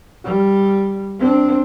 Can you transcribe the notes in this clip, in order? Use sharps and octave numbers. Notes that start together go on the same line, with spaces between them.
G3
C4 D4